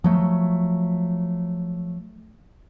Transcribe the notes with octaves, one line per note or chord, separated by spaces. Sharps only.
F3 F#3 A3